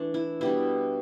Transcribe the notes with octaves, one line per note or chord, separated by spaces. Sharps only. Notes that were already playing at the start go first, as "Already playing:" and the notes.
Already playing: E3 A3 D4
E4
B2 G3 D4 E4